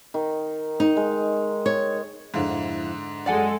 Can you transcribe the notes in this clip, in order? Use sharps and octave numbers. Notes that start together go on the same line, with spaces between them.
D#3
D#4
G#3
C#5
F2 G#2 D3 E4 F5
F#2 F#3 G#3 A4 D5 F#5 G#5